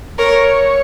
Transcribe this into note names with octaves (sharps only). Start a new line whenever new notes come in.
A#4 C#5